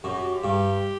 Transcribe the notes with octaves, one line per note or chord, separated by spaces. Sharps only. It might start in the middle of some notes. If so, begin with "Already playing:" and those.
F#2 G4
F#4
G4
G2